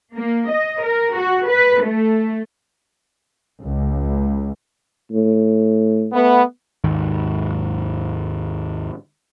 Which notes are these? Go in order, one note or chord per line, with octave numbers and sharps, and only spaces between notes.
A#3
D#5
A#4
F#4
B4
A3
C#2
A2
A3 B3
G#1 D#2 G#2 D#3